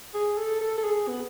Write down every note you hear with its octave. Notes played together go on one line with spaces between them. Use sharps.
G#4
A4
A4
A4
G#4
B3